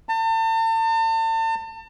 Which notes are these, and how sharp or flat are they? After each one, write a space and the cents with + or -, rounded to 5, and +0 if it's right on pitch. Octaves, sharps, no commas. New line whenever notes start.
A5 +40